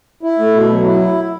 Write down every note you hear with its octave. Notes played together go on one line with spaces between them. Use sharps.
E4
A3
B2
F#3
E4